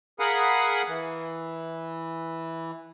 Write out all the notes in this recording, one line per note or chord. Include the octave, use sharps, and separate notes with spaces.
G#4 A#4 F5 F#5 B5 D#6
E3